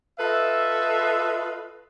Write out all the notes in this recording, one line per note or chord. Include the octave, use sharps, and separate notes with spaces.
F4 A4 B4 D#5 E5